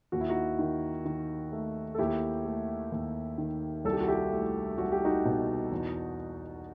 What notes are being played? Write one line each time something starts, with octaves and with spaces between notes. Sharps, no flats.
D#2 F#4
E4
D#4 F#4
D#3
D#3
A3
A4
D#2 E4 G4
A3
D#2
D#3
C2 A4
G4
F#4
E4 G4
A3
C2 F#4
G4
D#4 F#4
B2
E2